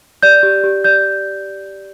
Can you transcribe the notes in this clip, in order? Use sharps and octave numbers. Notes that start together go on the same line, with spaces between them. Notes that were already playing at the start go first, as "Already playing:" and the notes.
D5 G6
G4
G4
D5 G6